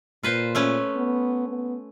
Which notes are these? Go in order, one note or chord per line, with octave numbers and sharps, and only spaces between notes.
A#2 F4 B4 C5
A3 C#4 B4
B3
B3